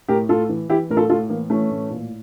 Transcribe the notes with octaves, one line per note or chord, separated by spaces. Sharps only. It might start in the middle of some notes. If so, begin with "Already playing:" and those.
A2 G4 A#4
A2 F4 A4
E3
E3 E4 G4
A2 A#4
F4 A4
A2 F4 A4
E3 A#3
E3 A3 C#4
A2
A#2